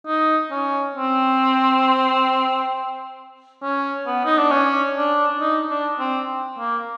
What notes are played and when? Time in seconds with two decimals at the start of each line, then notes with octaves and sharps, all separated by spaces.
0.07 D#4
0.51 C#4
0.96 C4
3.63 C#4
4.07 B3
4.25 D#4
4.38 D4
4.51 C#4
4.96 D4
5.40 D#4
5.70 D4
5.99 C4
6.59 A#3